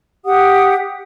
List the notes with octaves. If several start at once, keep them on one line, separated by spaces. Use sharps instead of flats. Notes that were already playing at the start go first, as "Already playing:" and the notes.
G4 F#5 D#6